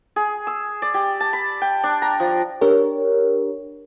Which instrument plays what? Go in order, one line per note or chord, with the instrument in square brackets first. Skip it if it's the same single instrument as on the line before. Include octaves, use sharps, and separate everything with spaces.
[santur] G#4
E6
D5
G4
A5
B5
G5
D4
A#5
F3
[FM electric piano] D4 G4 A#4 C#5